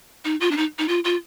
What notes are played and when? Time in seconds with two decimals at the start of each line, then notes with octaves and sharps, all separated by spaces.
0.25 D#4
0.41 F4
0.51 D4
0.57 D#4
0.79 D#4
0.89 F4
1.04 F4